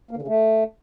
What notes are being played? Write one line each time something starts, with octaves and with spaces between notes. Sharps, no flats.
A#3
D3
C#3
A3